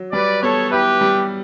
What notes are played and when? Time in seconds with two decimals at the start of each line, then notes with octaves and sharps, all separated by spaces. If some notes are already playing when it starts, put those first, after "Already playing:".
Already playing: F#3
0.12 G3 B4 D5
0.42 B3 A4 C#5
0.71 E4 G4 B4
1.01 G3